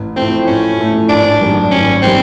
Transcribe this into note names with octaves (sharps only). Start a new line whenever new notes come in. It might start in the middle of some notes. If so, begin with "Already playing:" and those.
Already playing: A1
A2 F3 A3 C4
A1 C#4
A2 F3 A3
G#1 D4
F#2 D#3 G3
G#1 C#4
D#3 G3 C4